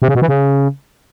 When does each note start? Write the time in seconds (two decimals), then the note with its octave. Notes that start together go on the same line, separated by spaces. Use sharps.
0.02 C3
0.08 C#3
0.15 B2
0.22 E3
0.28 C#3